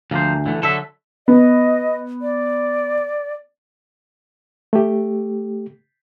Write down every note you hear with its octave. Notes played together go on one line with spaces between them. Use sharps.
D2 F3 A#3 C5
D3 E3 A3
D3 F#3 A4 E5
B3 D#5
D5
A3 G4